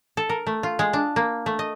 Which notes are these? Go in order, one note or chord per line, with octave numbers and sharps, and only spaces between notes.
A4
A#4
A3
F4
G#3
D4
A#3
A3
D#5